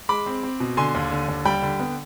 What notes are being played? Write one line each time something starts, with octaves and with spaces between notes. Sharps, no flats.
G#3 B5 D6
C4
C4
B2
D3 G#5 C6
D#2
D3
D#2
G3 G5 B5
D3
B3